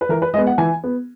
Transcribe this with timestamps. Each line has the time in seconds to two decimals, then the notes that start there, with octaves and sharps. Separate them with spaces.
0.01 B4
0.09 E3 A#4
0.22 B4
0.34 G#3 D#5
0.38 B3
0.47 F#5
0.58 E3 G#5
0.84 B3